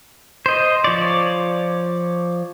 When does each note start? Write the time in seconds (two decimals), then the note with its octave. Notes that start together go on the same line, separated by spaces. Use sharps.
0.46 C5 D#5
0.84 F3 C#5 D5